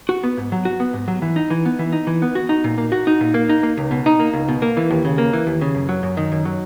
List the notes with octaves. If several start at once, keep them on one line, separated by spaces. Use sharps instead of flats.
F#4
B3
G#2
F#3
F#4
B3
G#2
F#3
E3
D#4
E3
B3
E3
D#4
E3
B3
F#4
D#4
A#2
A#3
F#4
D#4
A#2
A#3
D#4
A#3
C#2
B2
D#4
A#3
C#2
B2
A#3
E3
D#2
C#3
A#3
E3
D#2
C#3
F#2
F#3
F#2
D#3
F#2
F#3